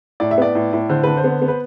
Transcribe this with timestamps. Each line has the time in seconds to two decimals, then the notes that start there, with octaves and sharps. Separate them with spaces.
0.20 A2 D5
0.31 E5
0.38 B3 D5
0.55 A2
0.73 A2
0.89 D3 C5
1.03 D3 B4
1.17 C5
1.24 B3
1.42 B3
1.48 B4